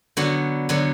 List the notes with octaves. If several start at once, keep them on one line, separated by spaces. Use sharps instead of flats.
D3 F#3 B3 F#4
D3 F#3 B3